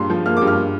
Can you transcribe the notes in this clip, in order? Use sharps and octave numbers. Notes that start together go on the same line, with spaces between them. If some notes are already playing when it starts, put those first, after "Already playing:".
Already playing: G2 A#2 C6
F3
A#3 F6
G2 D6
F6